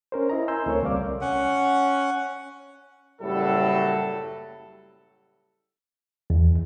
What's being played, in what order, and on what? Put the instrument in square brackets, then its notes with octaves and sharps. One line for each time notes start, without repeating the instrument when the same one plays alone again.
[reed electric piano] C#4 A#4 C5
E4 D#5 A#5
G#5 C6 E6 G6
D2 A3 C4 A#4 C#5
C2 G3 D5 F5 D6
[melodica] C#4 F#5
[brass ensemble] F#1 A2 F#3 G3 A4
[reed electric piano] E2